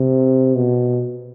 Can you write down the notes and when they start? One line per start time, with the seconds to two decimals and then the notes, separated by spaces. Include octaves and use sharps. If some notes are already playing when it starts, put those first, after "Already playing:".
Already playing: C3
0.55 B2